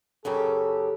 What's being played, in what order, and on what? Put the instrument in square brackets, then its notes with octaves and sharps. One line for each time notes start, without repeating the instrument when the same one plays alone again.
[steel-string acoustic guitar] F#2 C#3 G4 [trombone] A4